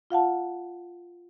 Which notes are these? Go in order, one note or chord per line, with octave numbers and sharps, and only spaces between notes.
F4 F5 F#5 A5